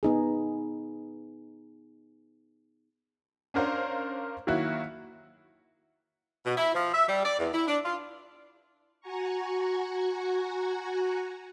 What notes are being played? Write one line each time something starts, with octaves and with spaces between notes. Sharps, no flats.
B3 D#4 G#4
C#4 D4 A#4 C5 F5
D#3 F#3 A#3 E4 F#4
B2
E4
F3
E5
G3
D5
E2
E4
D4
F4
F#4 F#5 G#5 A#5 C#6